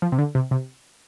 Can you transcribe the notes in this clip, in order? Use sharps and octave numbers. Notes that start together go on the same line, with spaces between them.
F3
C3
D3
C3
C3